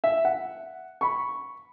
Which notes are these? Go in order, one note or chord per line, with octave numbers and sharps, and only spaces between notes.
E5
F#5
B5 C#6